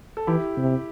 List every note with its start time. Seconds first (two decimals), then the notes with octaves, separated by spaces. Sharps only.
0.17 A4
0.27 E3 E4 G4
0.57 C3